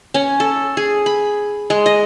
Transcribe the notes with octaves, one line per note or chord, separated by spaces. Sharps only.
C#4
A4
G#4
B5
G#3
D#5